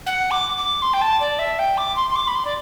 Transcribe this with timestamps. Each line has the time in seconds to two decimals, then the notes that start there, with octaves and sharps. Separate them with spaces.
0.06 F#5
0.31 D6
0.57 D6
0.82 C6
0.93 G5
1.01 A5
1.20 D5
1.39 E5
1.59 G5
1.77 D6
1.96 C6
2.10 C6
2.16 D6
2.27 B5
2.35 C6
2.45 D5